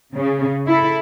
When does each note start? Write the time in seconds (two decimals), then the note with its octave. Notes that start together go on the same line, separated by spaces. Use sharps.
0.15 C#3
0.67 E4 A4